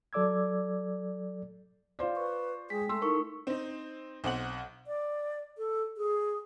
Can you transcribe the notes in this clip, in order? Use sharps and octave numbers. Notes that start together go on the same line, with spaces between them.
F#3 A4 D5 D6 E6 G#6
F4 C5 D5
B4 C#6
G#3 G#4 G5 B6
A3 C6 E6
D#4 E4 A#4 C#6
C4 D#4
B1 C4 F#5 F#7
D5
A4
G#4